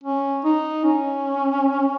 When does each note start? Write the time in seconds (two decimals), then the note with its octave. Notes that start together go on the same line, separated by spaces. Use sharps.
0.04 C#4
0.44 D#4
0.84 C#4